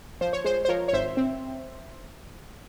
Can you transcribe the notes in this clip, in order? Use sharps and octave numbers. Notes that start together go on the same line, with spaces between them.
F3 C5
C#5
G#3 C5
C5
F3 A#4 C#5
C#5
G#1 C5 E5
C4